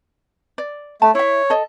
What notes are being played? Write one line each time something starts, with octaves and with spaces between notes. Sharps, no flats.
D5
A3 A5
E4 C#5 E5
A4 D#5